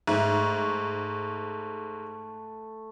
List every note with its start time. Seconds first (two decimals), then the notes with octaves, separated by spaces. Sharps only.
0.07 G#2 A3